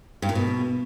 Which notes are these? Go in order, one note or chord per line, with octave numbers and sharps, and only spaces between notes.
G2
A#2
B2